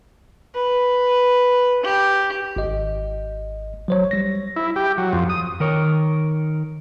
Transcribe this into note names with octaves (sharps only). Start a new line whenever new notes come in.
B4
G4
G#1 D#5
F#3 C5 C#5
G3 A#6
E4
G4
F#3
F2
D#6
D#3 A#4 C#5